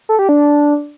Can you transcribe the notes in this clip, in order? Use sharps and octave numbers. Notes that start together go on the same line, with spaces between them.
A4
G4
D4